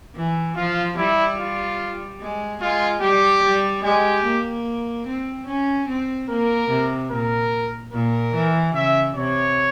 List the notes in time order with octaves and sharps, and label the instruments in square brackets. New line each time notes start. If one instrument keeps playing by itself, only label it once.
[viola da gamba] E3
[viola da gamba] F3 [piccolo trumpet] F4
[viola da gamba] G3 [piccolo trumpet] E4
[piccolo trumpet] F4
[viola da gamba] G#3
[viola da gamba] G#3 [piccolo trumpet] F4
[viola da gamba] G3 [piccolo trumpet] G4
[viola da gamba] G3
[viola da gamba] G#3 [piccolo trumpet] G4
[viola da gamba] A#3
C4
C#4
C4
[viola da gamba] A#3 [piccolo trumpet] A#4
[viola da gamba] C3
[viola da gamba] A#2 [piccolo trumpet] A#4
[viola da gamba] A#2 [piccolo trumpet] A#4
[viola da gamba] E3
[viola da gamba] C#3 [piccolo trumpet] E5
[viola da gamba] C3 [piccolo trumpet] C#5